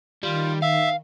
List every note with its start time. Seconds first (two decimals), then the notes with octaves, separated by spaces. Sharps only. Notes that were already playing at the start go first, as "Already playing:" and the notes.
0.23 D#3 G3 F4
0.62 E5 F5